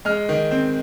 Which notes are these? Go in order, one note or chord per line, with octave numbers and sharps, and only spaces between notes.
G#3 F6
D#3
C4